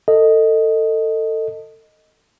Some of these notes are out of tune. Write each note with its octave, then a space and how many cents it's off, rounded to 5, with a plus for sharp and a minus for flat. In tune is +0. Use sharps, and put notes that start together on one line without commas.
A4 +25 D#5 +0